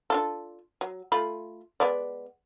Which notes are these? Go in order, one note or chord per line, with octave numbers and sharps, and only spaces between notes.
D4 F4 A4
F#3
A3 F4 B5
G#3 B3 D5